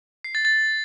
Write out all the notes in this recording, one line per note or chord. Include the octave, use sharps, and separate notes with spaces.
C7
A6
A6